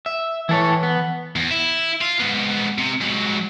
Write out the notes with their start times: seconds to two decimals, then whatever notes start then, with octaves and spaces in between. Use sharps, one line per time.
0.06 E5
0.49 E3 E4 A4 C#5
0.83 B3
1.36 E2
1.51 E4
2.01 F4
2.19 G#2 B3
2.78 C3
3.01 G#2 F#3